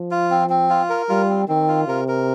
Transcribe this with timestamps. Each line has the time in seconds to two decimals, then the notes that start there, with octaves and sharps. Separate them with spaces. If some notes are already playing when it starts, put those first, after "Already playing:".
Already playing: F3
0.11 F4
0.30 C4
0.50 C4
0.70 F4
0.89 A#4
1.09 G3 F4
1.29 C4
1.48 D#3 C4
1.68 F4
1.87 C3 A#4
2.08 A#4